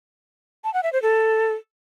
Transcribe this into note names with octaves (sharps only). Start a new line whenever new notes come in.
A5
F#5
E5
C5
A4